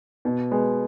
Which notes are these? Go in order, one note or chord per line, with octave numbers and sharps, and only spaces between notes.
B2
G#3 B3